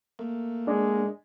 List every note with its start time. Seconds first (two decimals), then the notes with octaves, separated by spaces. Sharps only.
0.19 A3 A#3
0.67 G#3 D4 D5